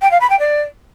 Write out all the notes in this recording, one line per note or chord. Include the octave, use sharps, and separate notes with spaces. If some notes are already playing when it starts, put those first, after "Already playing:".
G5
F5
B5
G5
D5